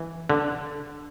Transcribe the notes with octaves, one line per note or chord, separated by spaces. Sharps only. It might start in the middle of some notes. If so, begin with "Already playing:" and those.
Already playing: E3
D3